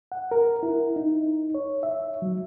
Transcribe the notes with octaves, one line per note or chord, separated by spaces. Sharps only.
F#5
A#4
E4
D#4
C#5
E5
F#3